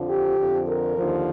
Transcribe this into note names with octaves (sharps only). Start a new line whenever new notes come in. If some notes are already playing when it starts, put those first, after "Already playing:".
Already playing: F2 D3 F3
G4
F2 D3 F3
A#4
D#2 D3 F3